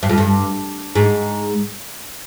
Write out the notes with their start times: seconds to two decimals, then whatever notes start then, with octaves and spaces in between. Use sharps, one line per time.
0.03 G2
0.09 F2
0.18 G2
0.95 G#2